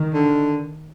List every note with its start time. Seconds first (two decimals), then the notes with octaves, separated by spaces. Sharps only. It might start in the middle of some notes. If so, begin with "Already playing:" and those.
Already playing: D#3
0.14 D3